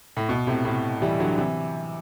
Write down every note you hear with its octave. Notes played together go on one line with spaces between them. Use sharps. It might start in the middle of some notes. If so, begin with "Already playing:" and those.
A2
B2
A2 C3
A2 C3
E3 G3
D3 F#3
C3 E3